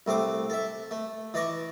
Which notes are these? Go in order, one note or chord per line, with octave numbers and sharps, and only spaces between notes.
C2 A3 C4 D6
A4 E5
A3
E3 D5 D#5 C#6